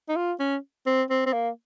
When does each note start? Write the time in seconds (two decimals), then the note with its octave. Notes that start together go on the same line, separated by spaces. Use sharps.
0.09 D#4
0.16 F4
0.40 C#4
0.86 C4
1.10 C4
1.26 C4
1.33 A#3